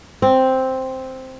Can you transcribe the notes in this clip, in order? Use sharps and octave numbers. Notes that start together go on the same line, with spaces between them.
C4